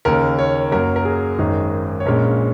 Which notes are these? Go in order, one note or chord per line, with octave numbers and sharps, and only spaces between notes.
D#2 C#3 A#3 A#4
C#5
F#2 F#3 A#3 A#4
A#4
G#4
G#1 F#2 D#3 G#3 D#4 G#4
C#5
A#1 A#2 G#3 C#4 A#4